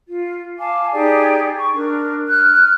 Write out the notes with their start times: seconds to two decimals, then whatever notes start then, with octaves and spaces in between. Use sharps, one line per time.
0.07 F4
0.58 F5 G#5 A5 D6
0.93 D#4 G4 G#4 D5
1.58 C#6
1.73 D4 A#4
2.28 F6 F#6